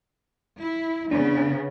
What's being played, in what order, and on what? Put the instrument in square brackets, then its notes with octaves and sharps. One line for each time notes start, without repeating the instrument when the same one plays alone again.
[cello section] E4
[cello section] C#3 B3 [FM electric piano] D4